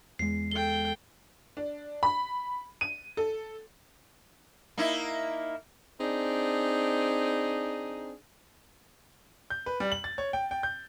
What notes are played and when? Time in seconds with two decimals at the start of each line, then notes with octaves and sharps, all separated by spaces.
0.19 E2 G#3 C7
0.52 A4 G5 G7
1.57 D4
2.03 B5
2.81 D#7
3.17 A4
4.78 A#3 D#4 E4
6.01 C4 D4 D#4 G#4
9.50 G6
9.66 B4
9.80 G3
9.92 F#7
10.04 A6
10.18 C#5
10.33 G5
10.51 G5
10.63 G6